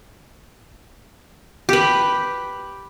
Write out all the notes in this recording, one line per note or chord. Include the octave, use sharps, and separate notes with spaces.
G4 B4